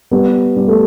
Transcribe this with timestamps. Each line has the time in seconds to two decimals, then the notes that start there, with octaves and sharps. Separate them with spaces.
0.11 G3 B3
0.57 G3
0.68 A3